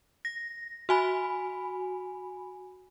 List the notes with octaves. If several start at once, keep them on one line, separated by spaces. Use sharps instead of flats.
A#6
F#4 G#5 B5